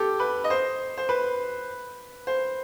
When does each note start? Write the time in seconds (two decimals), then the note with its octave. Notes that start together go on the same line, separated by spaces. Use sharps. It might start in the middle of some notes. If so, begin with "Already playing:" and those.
Already playing: G4 A4
0.20 B4
0.44 D#5
0.50 C5
0.98 C5
1.09 B4
2.27 C5